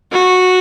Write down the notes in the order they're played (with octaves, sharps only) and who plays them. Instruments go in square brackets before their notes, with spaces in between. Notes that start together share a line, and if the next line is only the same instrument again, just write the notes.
[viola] F#4